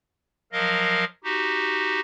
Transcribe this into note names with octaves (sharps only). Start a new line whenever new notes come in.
F3 F#3 A#4 D#5 F5
D#4 F#4 G4